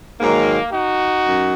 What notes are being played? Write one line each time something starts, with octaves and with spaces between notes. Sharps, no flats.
G#2 D#3 F#3 A#3
D#4 F#4
F#2